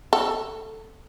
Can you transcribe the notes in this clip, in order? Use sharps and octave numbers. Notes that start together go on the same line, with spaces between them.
A4